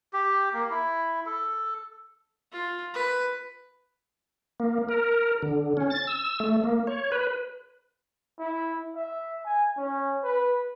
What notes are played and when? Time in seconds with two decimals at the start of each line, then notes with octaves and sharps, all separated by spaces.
0.13 G4
0.53 A#3
0.70 E4
1.26 A4
2.52 F4
2.94 B4
4.60 A#3
4.89 A#4
5.42 D3
5.77 C#4
5.90 A6
6.07 E6
6.40 A3
6.63 A#3
6.87 C#5
7.12 B4
8.39 E4
8.95 E5
9.45 G#5
9.77 C#4
10.23 B4